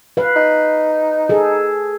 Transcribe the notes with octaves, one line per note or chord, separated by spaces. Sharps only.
B4 F5
D#4
G#4 A4